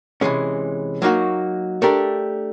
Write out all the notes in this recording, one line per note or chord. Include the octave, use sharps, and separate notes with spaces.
C3 E3 G#3 C#4
F#3 A#3 D#4 F#4
A3 D4 G4 A#4